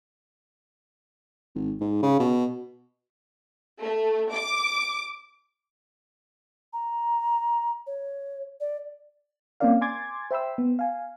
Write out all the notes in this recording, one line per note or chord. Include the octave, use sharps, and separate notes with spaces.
G#1
G#2
C#3
B2
A3
D6
A#5
C#5
D5
A#3 C4 C#4 A#4 D5 F5
G#5 C6 D6 G#6 A6
C5 E5 G5 B5 C6 E6
B3
F5 G#5